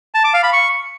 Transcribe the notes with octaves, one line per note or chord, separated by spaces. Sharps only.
A5
D6
F5
B5
C#6